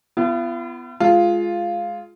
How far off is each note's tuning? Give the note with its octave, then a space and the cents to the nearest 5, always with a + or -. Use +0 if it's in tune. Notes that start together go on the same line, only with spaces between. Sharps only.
B3 +15 F4 -45
G#3 +15 F4 +0